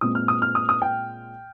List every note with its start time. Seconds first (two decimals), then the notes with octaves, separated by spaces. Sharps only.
0.01 A#2 G#3 C4 D#6
0.15 F6
0.28 D#6
0.42 F6
0.55 D#6
0.69 D#6
0.82 G5